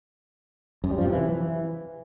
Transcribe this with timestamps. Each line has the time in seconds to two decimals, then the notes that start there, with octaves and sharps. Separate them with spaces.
0.84 F#2
0.91 G3
0.98 F3
1.05 C3
1.12 E3